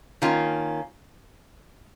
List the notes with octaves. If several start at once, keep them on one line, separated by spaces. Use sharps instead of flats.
D#3 A#3 C#4 F4